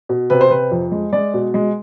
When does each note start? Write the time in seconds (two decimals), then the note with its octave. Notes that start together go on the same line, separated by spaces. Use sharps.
0.09 B2
0.30 C3 B4
0.41 C5
0.50 C3 B4
0.71 F2
0.92 G#3
1.13 G#3 D5
1.34 B2
1.54 G#3